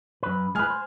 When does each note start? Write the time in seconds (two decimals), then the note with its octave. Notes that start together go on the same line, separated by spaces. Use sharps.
0.23 F#2 B4
0.55 G#3 B4 G#5 F6
0.70 C5